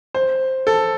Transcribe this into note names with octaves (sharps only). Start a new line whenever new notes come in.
C5
A4